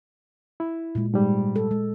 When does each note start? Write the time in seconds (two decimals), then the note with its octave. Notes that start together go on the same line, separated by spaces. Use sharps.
0.60 E4
0.95 A#2 G#3
1.14 G#2 G3
1.56 A4
1.71 G#3